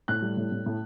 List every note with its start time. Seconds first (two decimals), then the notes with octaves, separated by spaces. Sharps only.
0.08 A2 F#6
0.22 G3
0.37 A2
0.52 A2
0.66 A2